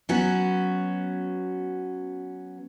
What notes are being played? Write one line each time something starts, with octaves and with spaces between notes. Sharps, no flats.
F#3 B3 C#4 F#4